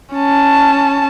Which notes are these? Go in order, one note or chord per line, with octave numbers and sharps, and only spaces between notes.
C#4 A5